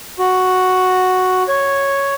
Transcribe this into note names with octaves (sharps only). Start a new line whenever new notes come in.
F#4
C#5